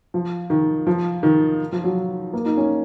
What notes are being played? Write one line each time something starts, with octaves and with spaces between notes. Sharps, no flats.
F3
D#3
F3
D#3
F3
F#3
A#3
D#4
C#4